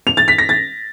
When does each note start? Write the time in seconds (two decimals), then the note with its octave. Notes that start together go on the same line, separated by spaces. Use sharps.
0.07 F7
0.17 A6
0.28 B6
0.38 A#6
0.49 A6